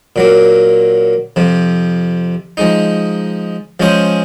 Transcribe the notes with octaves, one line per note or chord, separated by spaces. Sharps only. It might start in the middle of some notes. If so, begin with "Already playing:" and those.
A#2 F#3 A#3
F2 C3 F3
F3 G#3 D#4
F3 G#3 C#4 G#4 C5